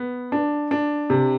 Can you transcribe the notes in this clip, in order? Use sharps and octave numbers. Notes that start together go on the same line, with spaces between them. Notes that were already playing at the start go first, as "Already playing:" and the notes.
Already playing: B3
D4
D4
C3